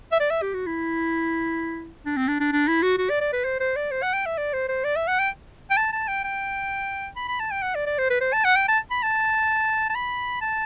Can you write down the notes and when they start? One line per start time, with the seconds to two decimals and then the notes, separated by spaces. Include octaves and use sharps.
0.12 E5
0.20 D5
0.31 E5
0.42 G4
0.54 F#4
0.67 E4
2.06 D4
2.17 C4
2.28 D4
2.40 D4
2.52 D4
2.68 E4
2.83 F#4
2.98 F#4
3.10 D5
3.21 D5
3.33 B4
3.45 C5
3.60 C5
3.76 D5
3.91 C5
4.03 F#5
4.14 G5
4.26 E5
4.38 D5
4.53 C5
4.69 C5
4.84 D5
4.96 E5
5.08 F#5
5.19 G5
5.71 G5
5.77 A5
5.93 A5
6.08 G5
6.24 G5
7.16 B5
7.28 B5
7.40 A5
7.51 G5
7.63 F#5
7.75 D5
7.86 D5
7.99 C5
8.10 B4
8.21 C5
8.33 A5
8.45 F#5
8.56 G5
8.68 A5
8.91 B5
9.03 A5
9.90 A5
9.95 B5
10.41 A5